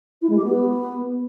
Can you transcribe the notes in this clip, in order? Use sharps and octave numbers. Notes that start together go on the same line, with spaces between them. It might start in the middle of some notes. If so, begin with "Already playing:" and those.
E4
G#3
G4
B3